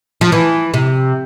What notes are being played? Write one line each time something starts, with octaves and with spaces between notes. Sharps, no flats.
F3
E3
C3